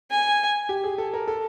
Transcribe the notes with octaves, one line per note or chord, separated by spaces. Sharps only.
G#5
G4
G#4
A4
A#4
A4